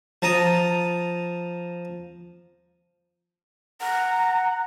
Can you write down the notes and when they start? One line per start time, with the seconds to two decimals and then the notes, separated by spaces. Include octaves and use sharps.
0.22 F3 A5 A#5 D#6
3.82 F#5 A#5